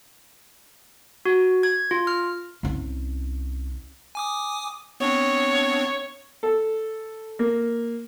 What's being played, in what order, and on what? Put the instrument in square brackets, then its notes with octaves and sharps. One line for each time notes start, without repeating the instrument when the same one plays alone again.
[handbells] F#4
G#6
F4
F6
[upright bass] C2 C#4
[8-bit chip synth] G#5 D6 D#6
[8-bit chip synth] B3 C4 D4 [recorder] C#5
[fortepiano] A4
A#3